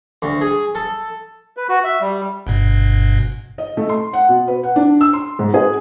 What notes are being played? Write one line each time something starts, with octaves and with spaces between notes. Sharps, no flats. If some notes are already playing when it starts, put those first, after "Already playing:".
D2
G#4
A4
B4
F#4
E5
G3
G1 G2 B2
D#5
A3
C6
F#5
B2
B4
F#5
D4
E6
C6
G#2
G#4